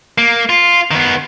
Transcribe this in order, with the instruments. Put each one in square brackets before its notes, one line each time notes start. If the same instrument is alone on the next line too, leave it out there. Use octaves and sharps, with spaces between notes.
[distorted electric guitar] A#3
F4
D#3 B3